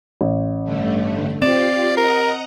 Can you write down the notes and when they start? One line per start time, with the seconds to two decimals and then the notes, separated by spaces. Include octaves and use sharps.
0.21 A1
0.64 G2 D3 A3
1.42 C4 F4 G4 D5 C7 E7
1.97 A#4 D#5 F#5 A#5